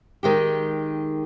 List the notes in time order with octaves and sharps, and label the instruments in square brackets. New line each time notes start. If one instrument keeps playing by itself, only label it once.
[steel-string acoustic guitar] D#3 G#3 G4